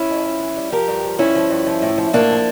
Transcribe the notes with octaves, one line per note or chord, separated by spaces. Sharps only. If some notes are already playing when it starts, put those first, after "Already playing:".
Already playing: C#4 E4
F2
F2
E3
G3
F3 G4 A#4
G2
F3
G2 C#4 E4
F3
G2
F3
A2
F3
A2 A#3 D4
F3